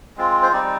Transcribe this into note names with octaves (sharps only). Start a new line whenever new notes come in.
G#3 C4 F4
C5
G3 C4 D#4 D5